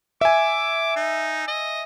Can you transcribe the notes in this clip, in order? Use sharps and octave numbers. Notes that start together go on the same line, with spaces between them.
E5 G#5 D6
D#4
D#5